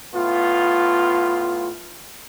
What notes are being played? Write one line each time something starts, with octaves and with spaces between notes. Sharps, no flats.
A2 B3 F4